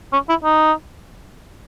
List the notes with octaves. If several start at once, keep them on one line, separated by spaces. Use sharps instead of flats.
C#4
E4
D#4